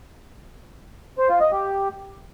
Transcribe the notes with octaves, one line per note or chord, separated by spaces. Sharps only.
C5
F4
D#5
G4